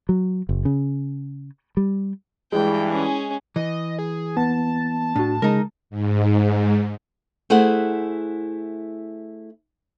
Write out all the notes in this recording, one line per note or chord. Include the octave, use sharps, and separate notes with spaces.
F#3
F#1
C#3
G3
G2 E3 G#3 E4 G5
C#4 G#4
E3 D#5
G#4
B3 A5
A2 D4 F#4
C#3 G#3 D#4 A#4
G#2
A3 E4 G#4 C5 F#5